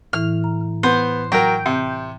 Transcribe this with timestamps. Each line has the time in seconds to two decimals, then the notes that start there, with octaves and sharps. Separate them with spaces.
0.13 A2 E3 E4 F6
0.44 A#5
0.83 B3 C5
1.32 F#3 A#4 G5
1.66 C3